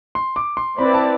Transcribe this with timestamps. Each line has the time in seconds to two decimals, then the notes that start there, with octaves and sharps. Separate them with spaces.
0.15 C6
0.36 D6
0.57 C6
0.78 C4 E4 B4 D5 B5
0.94 A5